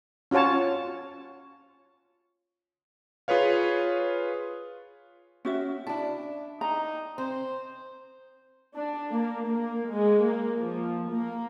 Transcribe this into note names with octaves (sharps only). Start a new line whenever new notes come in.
C#4 F4 F#4 C#5 A5
F4 G#4 B4 C#5 F5
C#4 F#4 E5
D4 E4 A5
D#4 A#5
C4 C5
D4
A#3
A#3
G#3
A#3
F3
A#3